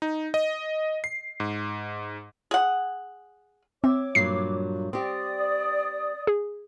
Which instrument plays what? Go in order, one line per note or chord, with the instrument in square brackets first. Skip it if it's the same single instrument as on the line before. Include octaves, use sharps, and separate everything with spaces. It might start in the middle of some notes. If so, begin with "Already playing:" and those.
[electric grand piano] D#4
D#5
C7
G#2
[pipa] G#4 F#5
[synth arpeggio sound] C4 [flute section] C#5 D6 [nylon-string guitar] E5
[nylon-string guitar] G2 A#2 F#3 [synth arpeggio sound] C7
[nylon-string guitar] C4 G4 [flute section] D5 D#6
[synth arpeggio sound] G#4